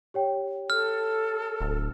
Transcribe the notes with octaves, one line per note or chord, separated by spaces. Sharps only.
G4 C#5 G5
A4 F6
D1